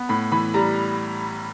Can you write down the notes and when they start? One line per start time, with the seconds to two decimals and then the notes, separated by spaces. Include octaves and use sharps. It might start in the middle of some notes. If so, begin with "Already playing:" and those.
Already playing: B3
0.09 A2 B5
0.32 E3 B5
0.54 G3 A#5